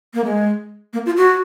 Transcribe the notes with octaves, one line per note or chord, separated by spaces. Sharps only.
A#3
G#3
A#3
F4
F#4